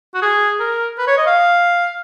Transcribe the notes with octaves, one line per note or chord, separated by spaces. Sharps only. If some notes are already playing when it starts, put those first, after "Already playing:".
F#4
G#4
A#4
B4
C#5
D#5
F5